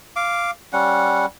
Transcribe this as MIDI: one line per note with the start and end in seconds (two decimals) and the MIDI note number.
0.16 0.51 77
0.16 0.51 86
0.73 1.26 55
0.73 1.26 61
0.73 1.26 78